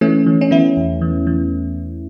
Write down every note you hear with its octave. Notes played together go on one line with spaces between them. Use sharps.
E3 A3 C#4
E3
C#4
E3 B3 E4
E2
E3
E3